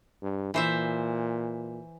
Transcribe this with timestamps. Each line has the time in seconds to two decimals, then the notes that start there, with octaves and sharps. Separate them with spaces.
0.22 G2
0.54 A#2 E3 C5 E5